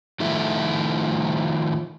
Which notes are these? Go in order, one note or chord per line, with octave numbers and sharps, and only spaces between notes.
D#3 F3 A3 E4